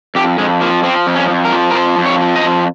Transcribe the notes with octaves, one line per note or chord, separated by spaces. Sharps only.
F2 G4
F2 G#3
F3 A#3
F3 C4
F2
C#4
F2
A#4
F3
A#4
F2 C5
F2
C#5
F3
D#5
F2